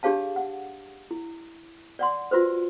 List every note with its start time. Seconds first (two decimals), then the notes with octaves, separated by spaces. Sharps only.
0.03 D4 G4 G#4 C#5 F5 A5
0.36 F#5
1.11 E4
1.99 D5 F#5 C6
2.31 F4 F#4 B4 C5